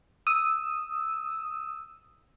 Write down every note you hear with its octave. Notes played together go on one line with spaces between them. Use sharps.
D#6 E6